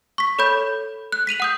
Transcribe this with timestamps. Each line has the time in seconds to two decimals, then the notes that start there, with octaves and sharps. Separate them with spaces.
0.18 C#6 B6
0.39 A4 C#5 B5 G6
1.12 F#6
1.27 B6 D#7 F7 F#7
1.40 F#5 D#6 G6